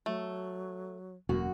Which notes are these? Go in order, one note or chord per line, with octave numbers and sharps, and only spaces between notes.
F#3 A3
E1 F#2 A#3 F#4